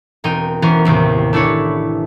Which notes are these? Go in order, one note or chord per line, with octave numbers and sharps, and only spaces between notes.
E1 C4 D#4 A#4 G5 D#7
E3 B3 C#4 A#4 C5
A1 D#2 C3 G5
A3 D4 E4 B4 C#5